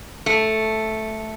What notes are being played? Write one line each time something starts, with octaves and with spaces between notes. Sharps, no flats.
A3